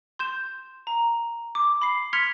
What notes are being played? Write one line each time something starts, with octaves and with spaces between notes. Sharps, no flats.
C6 G6 E7
A#5
D6
B5 C7
C6 F6 G#6 B6 C#7 F7